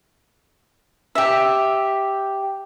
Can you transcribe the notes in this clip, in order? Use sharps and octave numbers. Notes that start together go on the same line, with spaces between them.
G4 E5